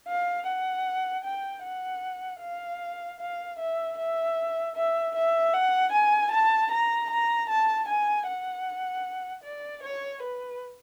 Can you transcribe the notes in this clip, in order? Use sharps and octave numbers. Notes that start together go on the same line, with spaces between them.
F5
F#5
G5
F#5
F5
F5
E5
E5
E5
E5
F#5
G#5
A5
A#5
A#5
A5
G#5
F#5
D5
C#5
B4